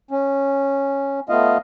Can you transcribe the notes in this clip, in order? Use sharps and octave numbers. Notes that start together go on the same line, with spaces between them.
C#4
A3 B3 F4 D#5 F5